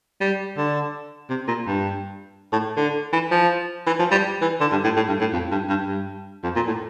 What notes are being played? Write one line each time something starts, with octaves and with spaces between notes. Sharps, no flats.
G3
D3
C3
A#2
G2
A2
D3
E3
F3
E3
F3
G3
E3
D3
G2
A2
A2
G2
A2
F2
G2
G2
G2
F2
A#2
A2